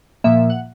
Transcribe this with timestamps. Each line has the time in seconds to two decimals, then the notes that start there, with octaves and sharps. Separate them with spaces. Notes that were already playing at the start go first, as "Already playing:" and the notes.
0.24 A#2 F3 A#3 E5
0.50 F#5